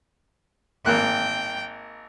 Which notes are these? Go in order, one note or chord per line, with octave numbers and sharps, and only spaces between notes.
G#1 A#3 G5 F#6